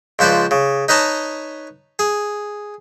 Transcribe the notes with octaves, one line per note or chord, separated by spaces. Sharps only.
C#2 F3 B4 C5 D5
C#3
D#4 B4 C#5 D#5 A5
G#4